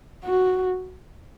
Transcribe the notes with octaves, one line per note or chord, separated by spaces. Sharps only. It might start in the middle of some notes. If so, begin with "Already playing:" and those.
F#4